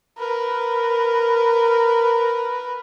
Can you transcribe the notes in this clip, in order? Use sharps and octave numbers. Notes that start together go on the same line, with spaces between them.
A#4 B4